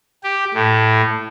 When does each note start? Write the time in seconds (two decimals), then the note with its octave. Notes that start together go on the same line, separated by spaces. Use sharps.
0.23 G4
0.54 A2